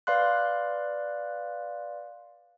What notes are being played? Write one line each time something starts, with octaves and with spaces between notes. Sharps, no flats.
B4 D5 F5 C6 F#6